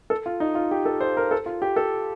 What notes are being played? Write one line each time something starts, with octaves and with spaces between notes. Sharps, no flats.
A4
F4
D#4
F4
G4
A4
C5
A#4
A4
F4
G4
A4